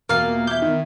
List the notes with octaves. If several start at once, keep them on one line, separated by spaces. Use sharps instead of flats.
E2 B2 A#3 F4 F5
E4 D6 G6
D#3